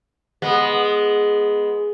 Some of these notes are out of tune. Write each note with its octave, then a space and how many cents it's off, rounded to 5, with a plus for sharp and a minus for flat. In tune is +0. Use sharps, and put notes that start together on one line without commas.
G#3 +0 B3 -15